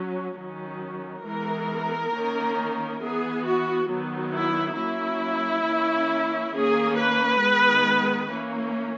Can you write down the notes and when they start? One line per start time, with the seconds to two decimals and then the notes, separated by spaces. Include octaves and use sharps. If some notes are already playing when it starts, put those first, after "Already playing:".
Already playing: F#3 C#4
0.37 D#3 F#3 C#4
1.25 E3 G#3 B3 A#4
2.13 D#3 A#3 C#4
3.01 E3 B3 G#4
3.45 F#4
3.89 D#3 F#3 B3
4.33 E4
4.77 F#3 A#3 C#4 E4
5.66 E3 A#3 C#4
6.53 D#3 A#3 C#4 G#4
6.97 B4
7.41 D#3 G#3 B3
8.29 E3 A#3 C#4